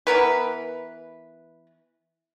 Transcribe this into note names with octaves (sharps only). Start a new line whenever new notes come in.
E3 B3 A#4 B4